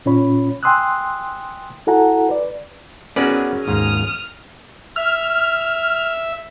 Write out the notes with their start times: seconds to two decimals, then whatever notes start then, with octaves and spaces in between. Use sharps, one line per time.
0.06 A#2 C#4 F4 C#5 B5
0.63 G5 G#5 C6 D#6 E6 F#6
1.87 E4 F#4 A4 F#5 G#5 A#5
2.29 B4 D5
3.16 B3 C#4 F#4 G#4 A#4 B4 D5
3.67 D#2 G#2 A#3 D#6 F6
4.96 E5 F6